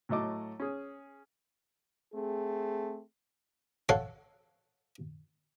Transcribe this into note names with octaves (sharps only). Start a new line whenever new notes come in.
A2 F#3 A3 D#5 D6
C#4 G#4
A3 C4 G#4
A4 C#5 F5 F#5